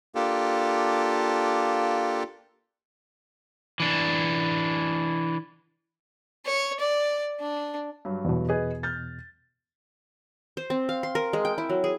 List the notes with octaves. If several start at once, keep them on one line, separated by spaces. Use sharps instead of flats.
A#3 D4 F4 G4 A4
E3 D4
C#5
D5
D4
G2 F#3
E2 B2
G#4 B4 D#5
F6 G6 A6
C5
C4
F5
C6
A#4
G#3
G5
E4
F#3
G#4